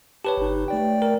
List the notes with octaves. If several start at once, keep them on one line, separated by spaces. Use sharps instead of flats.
G4 B4 C#5 A5
G1 D#4
A3 D5 G5
A#4